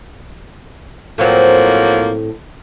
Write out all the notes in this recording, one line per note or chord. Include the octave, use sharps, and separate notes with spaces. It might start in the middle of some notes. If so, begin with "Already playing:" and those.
A2 F3 F#3 A#3 C4